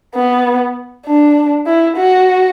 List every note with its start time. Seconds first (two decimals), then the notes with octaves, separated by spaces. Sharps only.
0.15 B3
1.06 D4
1.66 E4
1.96 F#4